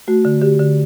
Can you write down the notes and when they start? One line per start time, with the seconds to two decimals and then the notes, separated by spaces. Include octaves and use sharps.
0.08 A3 F#4
0.25 D3
0.41 D3 G4
0.59 D3